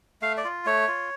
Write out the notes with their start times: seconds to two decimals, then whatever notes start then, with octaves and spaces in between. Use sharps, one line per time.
0.22 A3 F5
0.37 D5
0.44 F4
0.65 A3 C#5
0.88 F4